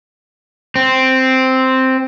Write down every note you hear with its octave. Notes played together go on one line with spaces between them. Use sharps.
C4